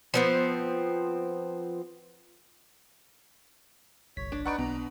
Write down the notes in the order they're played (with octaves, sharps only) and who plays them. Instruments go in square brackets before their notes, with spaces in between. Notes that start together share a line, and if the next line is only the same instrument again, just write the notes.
[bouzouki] F3 B3 C4
[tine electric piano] G1 C2 B6 [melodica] C#5
[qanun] D4
[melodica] D#4 B4 D5 [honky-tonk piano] F#5 C#6 D7
[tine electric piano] B1 [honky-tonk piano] B2 [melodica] A#5